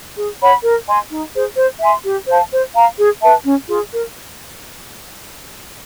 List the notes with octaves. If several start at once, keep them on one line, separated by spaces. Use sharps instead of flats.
G#4
C#5 F#5 B5
A#4
D#5 G#5 C6
D#4
G#4 C5
C5
E5 G#5 C6
G4
C5 F5 A5
C5
F5 A#5
G#4
B4 E5 A5
C#4
F4 G#4
A#4